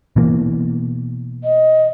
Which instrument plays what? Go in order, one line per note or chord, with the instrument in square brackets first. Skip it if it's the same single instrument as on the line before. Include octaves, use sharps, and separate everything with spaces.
[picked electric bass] B2 E3 A#3
[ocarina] D#5